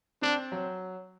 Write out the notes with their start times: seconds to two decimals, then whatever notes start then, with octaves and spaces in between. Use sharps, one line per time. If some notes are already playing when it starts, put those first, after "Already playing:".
0.22 C4 D4
0.52 F#3